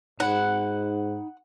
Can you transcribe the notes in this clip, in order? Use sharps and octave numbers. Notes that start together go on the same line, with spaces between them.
G#2 D#4 F#5 B5